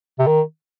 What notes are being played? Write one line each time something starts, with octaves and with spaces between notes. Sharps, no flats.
C3
D#3